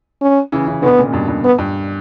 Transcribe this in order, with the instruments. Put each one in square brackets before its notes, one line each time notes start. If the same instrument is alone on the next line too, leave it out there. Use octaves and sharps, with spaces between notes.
[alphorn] C#4
[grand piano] C#3 E3
C#3 E3
[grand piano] B2 D3 [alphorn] B3
[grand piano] A#2 C#3
G2 B2
G2
[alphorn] B3
[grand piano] G2